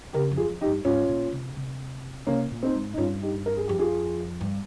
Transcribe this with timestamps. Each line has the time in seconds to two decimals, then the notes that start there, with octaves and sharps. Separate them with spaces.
0.13 C#3 G4 A#4
0.31 F2
0.37 F4 G#4
0.50 F2
0.61 D#4 G4
0.67 G2
0.85 G#2 C#4 F4
1.09 A#2
1.32 C3
1.56 C3
2.27 C3 A#3 C#4
2.51 A#2
2.63 C4 D#4
2.74 G#2
2.93 D#4
2.98 G2 C#4 F4
3.22 D#4 G4
3.46 A#4
3.57 G#4
3.68 F2 G4
3.79 F4 G#4
4.41 G2